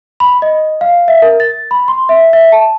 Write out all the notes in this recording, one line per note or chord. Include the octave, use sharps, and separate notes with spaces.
B5
D#5
F5
E5
A#4
A6
B5
C6
E5
E5
A5